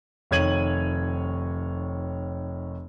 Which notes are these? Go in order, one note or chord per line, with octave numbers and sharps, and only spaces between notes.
F1 D#3 C#5 G#6 D#7 F#7